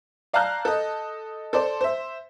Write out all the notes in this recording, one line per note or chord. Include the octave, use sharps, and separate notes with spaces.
D5 F5 A5 A#5 F#6 G6
A4 D#5
A4 C5 D5
C5 E5